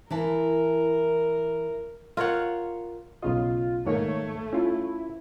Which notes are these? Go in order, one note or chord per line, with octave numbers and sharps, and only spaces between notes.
E3 E4 A#4 A5
F4 A#4 C#5 F#5
B1 C#3 F4 D#5
G#2 D#3 A3 A#3 C#5
C#4 E4 F4